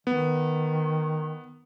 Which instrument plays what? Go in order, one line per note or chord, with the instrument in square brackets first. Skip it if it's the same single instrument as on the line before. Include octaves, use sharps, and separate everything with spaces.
[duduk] D#3 [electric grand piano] B3